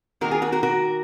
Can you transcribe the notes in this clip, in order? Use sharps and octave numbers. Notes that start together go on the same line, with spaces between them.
D#3 A#3 F#4 A#4
F4 G#4
F#4 A#4
F#4 A#4
F#4 A#4